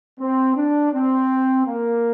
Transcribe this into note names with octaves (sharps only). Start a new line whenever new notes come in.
C4
D4
C4
A#3